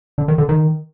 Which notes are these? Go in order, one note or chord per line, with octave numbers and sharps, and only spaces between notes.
D3
D#3
D3
D#3